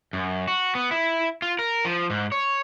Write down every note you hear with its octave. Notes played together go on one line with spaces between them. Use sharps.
F#2
F#4
B3
E4
F4
A#4
F3
G#2
C#5